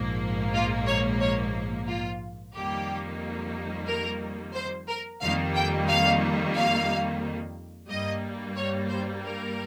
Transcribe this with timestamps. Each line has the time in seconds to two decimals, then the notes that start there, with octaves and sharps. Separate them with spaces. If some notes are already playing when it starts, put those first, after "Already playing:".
Already playing: A#1 G#2 F3 A#3
0.54 F4
0.86 C#5
1.20 C#5
1.87 F4
2.54 F2 D#3 G3 A#3 G4
3.87 A#4
4.54 C5
4.88 A#4
5.21 F2 D#3 G3 A#3 F5
5.55 G5
5.88 F5
6.55 F5
7.89 G2 G3 A#3 D#5
8.55 C#5
8.89 C5
9.23 A#4